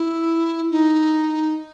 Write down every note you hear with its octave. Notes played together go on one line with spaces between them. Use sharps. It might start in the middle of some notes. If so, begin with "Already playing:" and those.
Already playing: E4
D#4